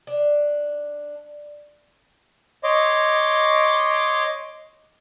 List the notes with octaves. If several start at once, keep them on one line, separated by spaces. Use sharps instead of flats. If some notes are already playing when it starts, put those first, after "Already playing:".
D4
C#5 D#5 C6 D6